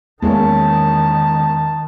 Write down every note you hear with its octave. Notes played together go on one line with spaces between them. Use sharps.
E2 D#3 G#3 A#3 C#4 A5